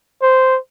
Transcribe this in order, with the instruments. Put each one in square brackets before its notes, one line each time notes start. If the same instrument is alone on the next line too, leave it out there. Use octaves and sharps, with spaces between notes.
[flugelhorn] C5